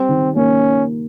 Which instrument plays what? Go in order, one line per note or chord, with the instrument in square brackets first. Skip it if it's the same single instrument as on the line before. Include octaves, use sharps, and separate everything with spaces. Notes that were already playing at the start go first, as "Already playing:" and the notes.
Already playing: [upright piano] G3 [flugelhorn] C4
[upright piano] D#3
[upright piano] A#3 [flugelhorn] C#4